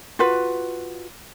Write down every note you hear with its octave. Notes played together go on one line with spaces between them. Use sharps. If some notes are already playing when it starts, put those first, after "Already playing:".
F4 F#4 B4